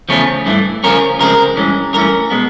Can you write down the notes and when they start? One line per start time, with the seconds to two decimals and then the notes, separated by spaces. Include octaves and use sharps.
0.09 E2 C#3 F3 A3 C#4
0.46 G2 E3 A3
0.84 C#3 F3 A#3 C#4 A#4
1.20 C#3 F3 G#3 C4 A#4
1.56 G2 E3 G#3 C#4
1.93 G2 E3 A3 C#4 A#4
2.31 B2 G#3 B3